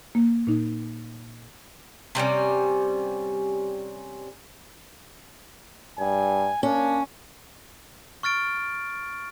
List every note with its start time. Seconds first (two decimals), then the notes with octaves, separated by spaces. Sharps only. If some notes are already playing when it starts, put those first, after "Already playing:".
0.15 A#3
0.47 A#2 D#4
2.15 C3 G3 C4 C#4
5.99 G2 G#5
6.63 A#3 C#4 D4
8.23 C#6 F6 A6 D7